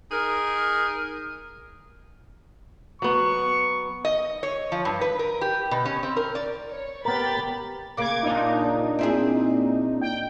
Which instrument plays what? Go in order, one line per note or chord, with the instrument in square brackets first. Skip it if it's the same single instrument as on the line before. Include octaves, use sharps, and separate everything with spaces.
[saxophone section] D#4 G#4 A#4
[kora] F#3 B3 [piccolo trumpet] C#6
[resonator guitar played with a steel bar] D#5
C#5
F3
G2
B4
A#4
G4
B2
C#4
C4
A#4
D5
[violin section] C#5
[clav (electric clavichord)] B3 A#4 [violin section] G4 B5 A6
[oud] C#3 A#3 [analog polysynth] D6 G#6
[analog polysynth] A#2 D4 D#4
[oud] C4 E4 G#4
[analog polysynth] G5